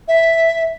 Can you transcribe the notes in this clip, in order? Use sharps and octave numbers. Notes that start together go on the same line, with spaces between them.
E5